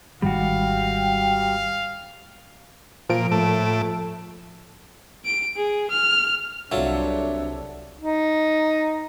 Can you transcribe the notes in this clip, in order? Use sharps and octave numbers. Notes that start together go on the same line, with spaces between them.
G#1 G#2 D#3 G3 F#4 F5 G5
A#2 F3 D7
A2 A3
D7
G#4
F6
C2 F#3 D4 F4 A4 C#5 E5
D#4